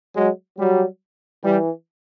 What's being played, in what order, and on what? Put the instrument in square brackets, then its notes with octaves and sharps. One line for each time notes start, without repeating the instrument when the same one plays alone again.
[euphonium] F#3 [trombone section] G#3
[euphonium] F#3 [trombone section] G3
[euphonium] E3 [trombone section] G3